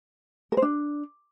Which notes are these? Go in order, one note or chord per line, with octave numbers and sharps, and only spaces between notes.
A#4
C5
D4